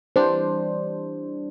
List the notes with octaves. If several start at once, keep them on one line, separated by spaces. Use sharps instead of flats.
E3 G3 D4 C5